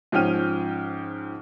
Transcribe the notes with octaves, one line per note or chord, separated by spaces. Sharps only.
G#2 F3 C#4 G5 F6 D#7